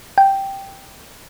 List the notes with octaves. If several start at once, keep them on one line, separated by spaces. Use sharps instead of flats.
G5